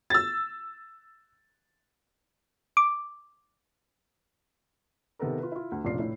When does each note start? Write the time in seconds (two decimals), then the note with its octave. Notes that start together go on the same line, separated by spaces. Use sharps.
0.10 E6 A6
2.77 D6
5.19 C3 D#3 B3 A4 A#4
5.39 F4 B4
5.52 E4 F4
5.72 D2
5.85 F1 A#1 C#3 F4 D5 C7
5.99 A2 E4